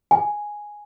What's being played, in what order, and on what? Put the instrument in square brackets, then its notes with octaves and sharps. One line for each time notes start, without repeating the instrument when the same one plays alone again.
[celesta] G#5